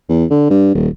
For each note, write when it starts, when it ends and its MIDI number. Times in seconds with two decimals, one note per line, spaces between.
0.09 0.25 40
0.30 0.48 50
0.50 0.74 43
0.74 0.88 27